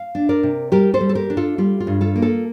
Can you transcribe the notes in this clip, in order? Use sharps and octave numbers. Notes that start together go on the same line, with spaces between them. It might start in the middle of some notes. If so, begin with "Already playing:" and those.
Already playing: F5
D4
A#4 D5
C3
G3 G4 A#4
A4 C5
G3
A4
G4 A#4
D4
F4 A4
G3 F4
F4
G2
F4 A4
A#3
F4 A4